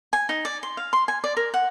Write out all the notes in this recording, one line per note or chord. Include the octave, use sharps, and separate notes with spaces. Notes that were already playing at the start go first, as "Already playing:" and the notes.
G#5
D#4
D5
C6
F5
C6
G#5
D5
A#4
F#5